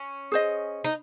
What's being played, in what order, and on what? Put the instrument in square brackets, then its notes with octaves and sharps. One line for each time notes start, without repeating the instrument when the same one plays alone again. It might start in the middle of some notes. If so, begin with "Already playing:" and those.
Already playing: [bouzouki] C#4
[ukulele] G#4 C5 D#5
[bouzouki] D#4